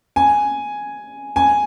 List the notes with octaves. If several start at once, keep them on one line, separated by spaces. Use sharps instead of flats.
G#5
G#5